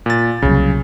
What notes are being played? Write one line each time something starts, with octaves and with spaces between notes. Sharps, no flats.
A#2 A6
C2 C#3 F#3